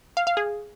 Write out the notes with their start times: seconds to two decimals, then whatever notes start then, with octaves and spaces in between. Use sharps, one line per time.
0.17 F5
0.27 F5
0.37 G#4